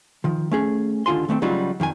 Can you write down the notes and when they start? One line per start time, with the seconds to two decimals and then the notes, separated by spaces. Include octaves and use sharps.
0.24 D#3 F3
0.52 A3 C#4 G#4
1.06 D#2 D3 F4 G#5 C6
1.29 D#3 A3 B3 C4
1.42 C#3 F#3 G3 D#4 F4 F#4
1.80 F2 D#3 G#4 G#5